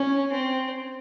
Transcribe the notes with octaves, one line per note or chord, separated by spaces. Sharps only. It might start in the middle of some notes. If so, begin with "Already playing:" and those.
Already playing: C#4
C4